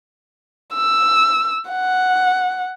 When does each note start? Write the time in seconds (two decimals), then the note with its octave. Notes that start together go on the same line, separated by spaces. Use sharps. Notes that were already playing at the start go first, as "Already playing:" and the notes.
0.75 E6
1.70 F#5